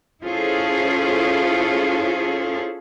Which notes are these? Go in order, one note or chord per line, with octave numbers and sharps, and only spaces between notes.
C#4 E4 F4 G#4 A4 C5